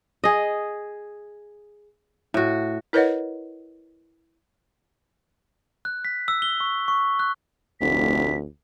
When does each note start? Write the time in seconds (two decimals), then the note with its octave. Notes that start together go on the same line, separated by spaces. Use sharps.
0.24 G#4 D#5
2.34 A2 F#4
2.93 E4 A#4 B4 C#5 D#5 F#5
5.85 F#6
6.05 B6
6.28 E6
6.42 G7
6.60 C#6
6.88 C#6
7.19 F#6
7.81 F1 D2 B6